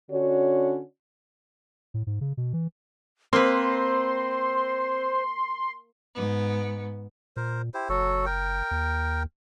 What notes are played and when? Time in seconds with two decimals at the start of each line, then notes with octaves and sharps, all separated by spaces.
0.11 D3 C#4 D4 F#4 C#5
1.94 A2
2.07 G#2
2.21 C#3
2.37 B2
2.53 E3
3.33 A#3 C4 B4 C5 C6
6.15 G#2 B3
7.37 A#2 A#4 C5
7.74 E4 G4 C5
7.89 F#1 F#3 F#4 A4
8.26 A#4 G5
8.71 D#2